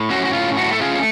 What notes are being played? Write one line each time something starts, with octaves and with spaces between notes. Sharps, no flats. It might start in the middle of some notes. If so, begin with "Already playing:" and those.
Already playing: A2
C#4 F#4
F#4
A2 F4
A3 F#4
A4
C#4 F4 G#4